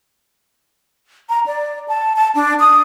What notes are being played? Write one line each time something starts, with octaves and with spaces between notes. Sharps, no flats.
A#5
D5
A5
A5
D4
D#6